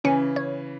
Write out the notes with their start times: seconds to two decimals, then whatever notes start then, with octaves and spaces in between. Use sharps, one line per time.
0.04 C#3 E3 C#4
0.36 C#5